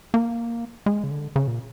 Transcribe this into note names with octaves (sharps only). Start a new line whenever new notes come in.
A#3
G#3
C#3
D3
C#3
A#2